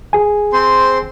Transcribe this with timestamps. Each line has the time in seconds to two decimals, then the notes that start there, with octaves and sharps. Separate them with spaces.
0.13 G#4 G#5
0.53 C4 C5 C6